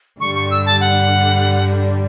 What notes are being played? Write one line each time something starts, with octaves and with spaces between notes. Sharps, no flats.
G2 D3 G3 C#6
C#6
E6
A5
F#5